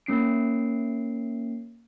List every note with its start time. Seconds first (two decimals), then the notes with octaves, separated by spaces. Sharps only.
0.06 A#3 C#4 C7 D7